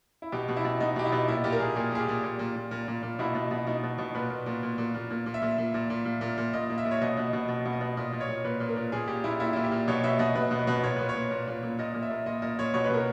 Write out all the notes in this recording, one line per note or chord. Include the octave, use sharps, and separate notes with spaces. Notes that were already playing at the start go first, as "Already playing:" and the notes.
E4
B2 G4
B2
E4
B2
B2 D#4
B2 G4
E4
B2
A#2 E4
A#2 G4
A#4
A#2 G#4
A#2 G#4
A#2 G#4
G4
A#2
A#2
A#2
A#2
A#2
A#2
A#2
B2 E4
B2
B2
B2 D#4
B2
B2
A#2 B4
A#2
A#2
A#2
A#2
A#2
A#2
A#2
E5
A#2
A#2
A#2
A#2
A#2
A#2
A#2
A#2 D#5
A#2
E5
A#2
C#5
B2 D#5
B2
B2
B2
B2
D#5
B2
A#2 D#5
A#2
C#5
A#2
A#2 B4
A#2
A#4
A#2
A#2 G#4
A#2 G4
A#2 E4
A#2 E4
A#2 E4
G4
A#2
B2 C#5
B2 E5
B2 D#5
B2 B4
B2
B4
B2
A#2 C#5
A#2 B4
C#5
A#2
A#2
A#2
A#2
A#2 D#5
A#2
E5
A#2
A#2 D#5
A#2 D#5
A#2 C#5
B2 C#5
B4
B2 A#4